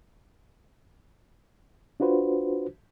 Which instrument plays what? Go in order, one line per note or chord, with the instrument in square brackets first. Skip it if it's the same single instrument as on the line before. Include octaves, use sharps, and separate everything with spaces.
[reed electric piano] D4 F4 F#4 B4 C5